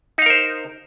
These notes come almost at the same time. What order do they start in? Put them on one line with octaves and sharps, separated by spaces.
D#4 F5 A#4 C5